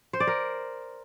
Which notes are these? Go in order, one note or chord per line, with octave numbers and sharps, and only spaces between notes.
C5
D5
A#4